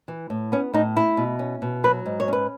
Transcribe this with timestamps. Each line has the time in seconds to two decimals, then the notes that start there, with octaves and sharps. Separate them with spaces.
0.08 E3
0.30 A2
0.52 B3 C#4
0.73 A2 D#4
0.96 A3 E4
1.17 B2
1.39 C#4
1.62 B2
1.84 F#3 B4
2.06 G#2
2.20 C#5
2.28 C#4 B4